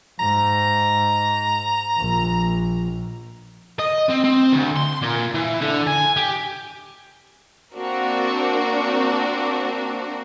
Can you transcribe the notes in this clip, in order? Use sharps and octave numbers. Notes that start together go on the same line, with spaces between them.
G#2 A#5
A#1
D#5
C4
C4
D2
C6
A#2
E3
D3
G#5
G4
A#3 C4 D4 F#4 A#4